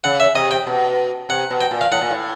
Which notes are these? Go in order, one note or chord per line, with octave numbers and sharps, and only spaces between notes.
C#3 F#5
E5
C3 D#5
G5
B2
C3 F#5
B2
G5
A#2
F5
A2 F#5
A#2
A2